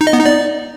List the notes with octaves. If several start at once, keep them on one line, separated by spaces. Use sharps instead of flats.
D#4
D#5
B3
D#4
D5